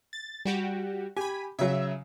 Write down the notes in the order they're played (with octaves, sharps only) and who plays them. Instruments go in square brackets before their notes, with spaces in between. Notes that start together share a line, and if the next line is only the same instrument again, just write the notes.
[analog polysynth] A6
G3 F#4 G4
[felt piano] G4 [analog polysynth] G#5 B5
[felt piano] C#3 F#3 [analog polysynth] E5